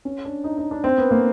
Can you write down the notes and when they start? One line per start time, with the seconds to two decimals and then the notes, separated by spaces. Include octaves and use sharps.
0.05 C#4
0.25 D4
0.44 D#4
0.58 D#4
0.71 D4
0.84 C4
0.98 B3
1.11 A#3